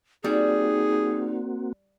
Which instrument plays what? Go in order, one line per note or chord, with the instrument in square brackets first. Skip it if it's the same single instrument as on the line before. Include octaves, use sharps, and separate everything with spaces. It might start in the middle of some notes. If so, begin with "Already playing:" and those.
[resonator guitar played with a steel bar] G3 [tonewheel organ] A#3 C4 F#4 [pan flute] D#4 [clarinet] G#4